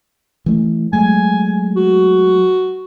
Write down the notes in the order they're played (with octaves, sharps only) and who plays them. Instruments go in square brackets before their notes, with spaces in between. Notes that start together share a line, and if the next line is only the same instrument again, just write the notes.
[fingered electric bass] E3 A3
[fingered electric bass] F#3 G#3 A3 [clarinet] G#5
[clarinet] F#4